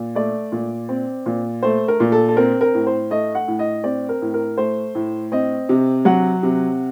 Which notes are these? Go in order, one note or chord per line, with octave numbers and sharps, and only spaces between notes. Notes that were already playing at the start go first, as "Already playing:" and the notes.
Already playing: A#2
A3 D5
A#2
C4
A#2
A3 C5
A#4
A#2
A4
A4
C4 A#4
A#4
A2
C5
A3 D#5
F#5
A2
D#5
C4 D5
A#4
A2
A#4
A3 C5
A2
C4 D#5
C3
F#3 F#5
C3